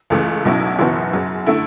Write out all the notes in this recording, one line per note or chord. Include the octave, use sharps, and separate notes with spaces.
C#2 C#3 E3 A3
B1 B2 F#3 C#4 E4
F#1 F#2 E3 B3 F#4
F#2 C#3 F#3
D3 A3 E4